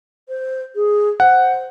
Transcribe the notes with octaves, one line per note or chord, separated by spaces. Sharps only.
C5
G#4
C5 F#5